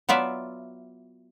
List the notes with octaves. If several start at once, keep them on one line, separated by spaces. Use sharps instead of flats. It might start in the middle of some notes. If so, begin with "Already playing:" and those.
F#3 B3 F4 D5 E5